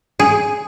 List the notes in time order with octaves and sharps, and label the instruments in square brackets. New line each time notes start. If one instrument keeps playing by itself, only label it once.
[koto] G#4